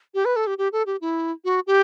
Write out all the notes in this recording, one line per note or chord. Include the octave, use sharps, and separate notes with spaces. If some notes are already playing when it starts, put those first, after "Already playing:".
G4
B4
A4
G4
G4
A4
G4
E4
F#4
G4